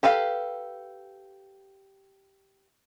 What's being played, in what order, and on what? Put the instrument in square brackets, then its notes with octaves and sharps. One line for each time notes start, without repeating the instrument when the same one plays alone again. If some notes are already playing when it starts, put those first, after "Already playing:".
[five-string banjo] G4 A4 B4 F5